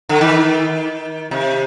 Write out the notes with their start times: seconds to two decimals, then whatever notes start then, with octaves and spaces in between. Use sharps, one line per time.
0.09 D3
0.21 D#3
1.31 C3